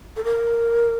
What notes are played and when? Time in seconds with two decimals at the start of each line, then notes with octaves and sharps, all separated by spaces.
0.16 A4
0.24 A#4